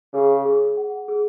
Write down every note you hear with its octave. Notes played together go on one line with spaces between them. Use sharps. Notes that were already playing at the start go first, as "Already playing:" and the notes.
C#3 G#4
G#4
F#5
G#4